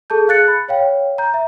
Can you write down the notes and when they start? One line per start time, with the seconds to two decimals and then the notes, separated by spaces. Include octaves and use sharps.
0.10 G#4 A4 A5 G6
0.27 G#4 F5 F#6 A6 C#7
0.48 B5
0.68 C#5 F5 G5
1.18 A#5 G6
1.34 E5